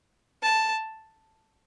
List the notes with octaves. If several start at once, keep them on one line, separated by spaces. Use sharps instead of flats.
A5